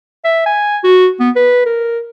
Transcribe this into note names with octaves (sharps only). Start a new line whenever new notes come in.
E5
G#5
F#4
B3
B4
A#4